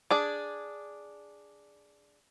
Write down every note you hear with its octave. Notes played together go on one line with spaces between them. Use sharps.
D4 G#4 D5